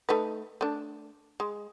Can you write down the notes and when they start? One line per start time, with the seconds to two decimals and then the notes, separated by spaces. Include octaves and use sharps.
0.09 A3 D#4 B4
0.61 A3 D4
1.40 G#3